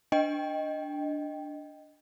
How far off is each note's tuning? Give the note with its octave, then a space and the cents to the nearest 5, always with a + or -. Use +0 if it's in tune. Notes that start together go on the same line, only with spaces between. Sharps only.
D4 +0 D#5 +0 G5 +0